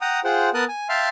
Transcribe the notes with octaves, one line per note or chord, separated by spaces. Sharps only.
F#5 G5 A#5 D#6
F4 G#4 C5 F#5 G5
B3 A#4 A5 D#6 F#6
G#5
E5 F5 G5 A5 C6 F6